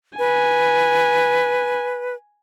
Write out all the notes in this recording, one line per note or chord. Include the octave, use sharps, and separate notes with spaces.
B4 G#5